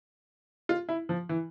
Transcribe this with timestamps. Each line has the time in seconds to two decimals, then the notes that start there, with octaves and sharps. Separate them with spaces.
0.69 F4
0.89 E4
1.09 F3
1.29 E3